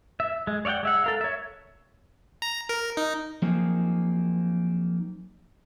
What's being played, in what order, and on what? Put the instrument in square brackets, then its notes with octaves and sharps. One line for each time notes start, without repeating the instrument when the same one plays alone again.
[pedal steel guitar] E5
G#3
C#5 D5 E5 F#5 G5
G#3 E5 F#5
A4 A#4 F5
C#5 E5
[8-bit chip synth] A#5
A#4
D#4
[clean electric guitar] F3 F#3 A#3 C4 D#4 G#4